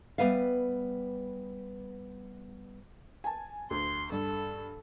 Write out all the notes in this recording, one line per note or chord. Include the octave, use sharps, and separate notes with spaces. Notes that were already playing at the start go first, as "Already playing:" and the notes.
G3 B3 B4 E5 F5
G#5 A5
D2 C6
G2 A4